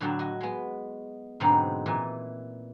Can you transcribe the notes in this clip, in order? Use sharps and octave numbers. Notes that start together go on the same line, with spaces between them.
A2 D3 F#3 F#4 G5 A5
F#4 D#5
G#3 B3
G#2 B2 D3 F#3 C4 D#4
A#2 E3